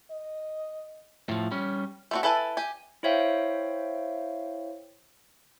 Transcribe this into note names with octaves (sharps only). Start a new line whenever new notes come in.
D#5
A2 F3
G3 C#4
A3 C4 F#4
E4 A4 B4 G#5 A5
G4 G#5
E4 C5 C#5 E5 F5 G5